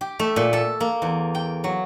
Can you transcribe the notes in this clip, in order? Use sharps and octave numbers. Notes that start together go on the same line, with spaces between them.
G4
A3
A#2
A4
A#3
E2
G5
F#3